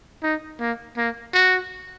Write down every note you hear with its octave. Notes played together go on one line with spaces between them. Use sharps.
D#4
A#3
A#3
F#4